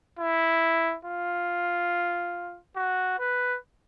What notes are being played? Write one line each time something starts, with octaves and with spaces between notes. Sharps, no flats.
E4
F4
F#4
B4